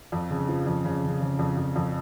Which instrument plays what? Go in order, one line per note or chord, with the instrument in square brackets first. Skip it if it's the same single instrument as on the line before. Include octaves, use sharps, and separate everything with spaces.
[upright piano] F2
C#3
F3
F2
C#3
C#3
C#3
F2
F2
F2